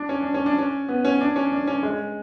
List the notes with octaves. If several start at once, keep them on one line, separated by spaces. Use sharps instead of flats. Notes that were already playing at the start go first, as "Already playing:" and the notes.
Already playing: D4
C#4
D4
C#4
D4
C#4
B3
C#4
D4
C#4
D4
C#4
G#3